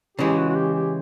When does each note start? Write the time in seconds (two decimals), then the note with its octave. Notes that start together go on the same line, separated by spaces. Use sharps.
0.17 C#3 E3 G#3 G4
0.37 F#4
0.49 F#4
0.55 G4
0.74 G4